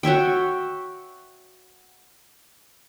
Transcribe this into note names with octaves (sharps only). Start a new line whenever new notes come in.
F#4 C#5 E5 G5